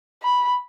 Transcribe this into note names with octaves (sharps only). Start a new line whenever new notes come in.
B5